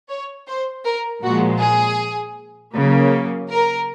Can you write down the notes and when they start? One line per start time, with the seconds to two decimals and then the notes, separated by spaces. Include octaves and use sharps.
0.09 C#5
0.47 C5
0.85 A#4
1.22 A#2 F3 G#3 F#4
1.61 G#4
2.74 C#3 F#3 A#3
3.51 A#4